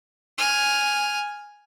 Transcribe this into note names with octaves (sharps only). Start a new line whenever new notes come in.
G#5 F6